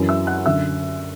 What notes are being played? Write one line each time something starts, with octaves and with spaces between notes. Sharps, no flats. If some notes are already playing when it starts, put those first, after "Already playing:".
Already playing: F#2 E3
E5 E6
F#5 F#6
F#2 D3 E5 E6